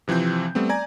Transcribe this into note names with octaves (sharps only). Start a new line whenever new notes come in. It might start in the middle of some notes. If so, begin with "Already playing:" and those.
C3 E3 F3 C4 G6
G3 A3 B3 C4
D5 G#5 A#5 G#6